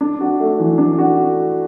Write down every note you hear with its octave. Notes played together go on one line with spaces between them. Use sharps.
D4
F#4
A3
E3
D4
F#4